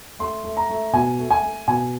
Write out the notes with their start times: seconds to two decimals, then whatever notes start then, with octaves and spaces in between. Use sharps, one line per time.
0.19 A3 C6
0.44 A3
0.57 A#5
0.70 A3
0.93 B2 G#5
1.19 A3
1.31 G#5
1.43 A3
1.68 B2 G#5